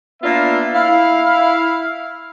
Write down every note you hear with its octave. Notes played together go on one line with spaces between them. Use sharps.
A#3 B3 D4 F4 E5
E4 F5